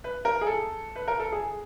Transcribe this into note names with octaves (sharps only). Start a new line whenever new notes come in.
B4
A#4
G#4
A4
B4
A#4
A4
G#4